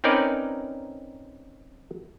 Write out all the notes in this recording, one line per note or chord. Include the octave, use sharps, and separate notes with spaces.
C4 C#4 D#4 A#4 B4 D5